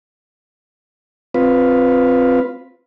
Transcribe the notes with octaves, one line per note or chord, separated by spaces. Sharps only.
C4 F4 B4